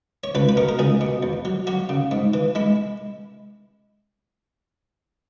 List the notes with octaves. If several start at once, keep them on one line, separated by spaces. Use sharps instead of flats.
C#5
C#2 B4
B4
B2 A#4
A#4
C#2 G#4
B2
E2
F#3
F#3 F#4
C#3
G#2
E3
G#3 E4